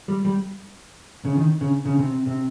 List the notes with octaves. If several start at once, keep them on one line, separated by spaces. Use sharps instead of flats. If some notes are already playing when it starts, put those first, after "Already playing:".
G3
G3
C#3
D#3
C#3
C#3
C3
C3